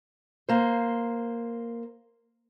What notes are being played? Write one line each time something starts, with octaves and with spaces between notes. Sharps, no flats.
A#3 C5